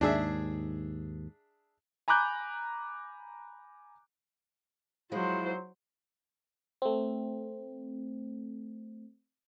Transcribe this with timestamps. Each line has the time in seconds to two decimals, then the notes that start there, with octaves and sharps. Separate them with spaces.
0.01 D#2 G#2 D4 G#4 E5
2.08 G#5 A#5 B5 D6 F#6 G6
5.12 F3 F#3 G#3 E4 C5
6.82 A3 C4